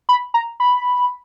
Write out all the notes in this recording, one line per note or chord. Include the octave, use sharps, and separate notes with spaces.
B5
A#5
B5